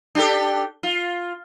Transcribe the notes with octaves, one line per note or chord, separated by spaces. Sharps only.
D4 G4 A4
F4